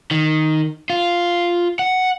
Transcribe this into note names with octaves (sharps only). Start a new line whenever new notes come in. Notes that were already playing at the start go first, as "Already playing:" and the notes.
D#3
F4
F#5